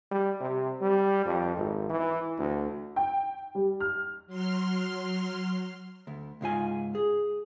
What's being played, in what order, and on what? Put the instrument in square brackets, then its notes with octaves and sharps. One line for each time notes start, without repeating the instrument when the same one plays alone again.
[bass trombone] G3
C3
G3
F2
G#1
E3
D2
[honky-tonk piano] G5
G3
F6
[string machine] F#3 C6 F6
[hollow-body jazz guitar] D2
C#2 G#2 F4 G#5
G#4